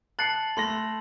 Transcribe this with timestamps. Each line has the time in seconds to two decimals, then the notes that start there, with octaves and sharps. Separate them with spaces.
0.19 A5 F#6 A6 C7 C#7 F#7
0.57 A3 B5 C6 A#6